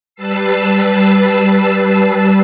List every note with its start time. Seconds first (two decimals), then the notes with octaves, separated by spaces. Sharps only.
0.15 G3 B4 A5 E6 C7